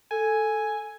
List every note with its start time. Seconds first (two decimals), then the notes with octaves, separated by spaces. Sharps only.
0.11 A4 G#5